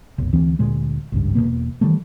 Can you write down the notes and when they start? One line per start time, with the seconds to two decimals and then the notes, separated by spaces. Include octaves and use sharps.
0.18 F1 B1
0.33 D2 E3 C4
0.59 D2 A#2 G#3
1.12 G#1 C#2 G2
1.35 E1 D#2 B2 A#3
1.81 D#3 E3 G3 A3